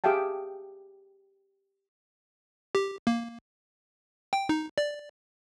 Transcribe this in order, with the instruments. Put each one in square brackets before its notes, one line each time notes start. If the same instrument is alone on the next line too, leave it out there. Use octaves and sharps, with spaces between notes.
[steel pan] G4 G#4 E5 F5 G5 A5
[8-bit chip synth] G4
A#3
G5
D#4
D5